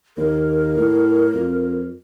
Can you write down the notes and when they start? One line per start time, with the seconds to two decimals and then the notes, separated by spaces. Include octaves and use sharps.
0.17 D#2 A#4
0.77 A2
1.34 F2